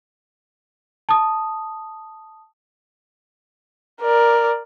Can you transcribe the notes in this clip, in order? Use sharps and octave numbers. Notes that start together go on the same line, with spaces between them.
A5 D#6
A#4 D5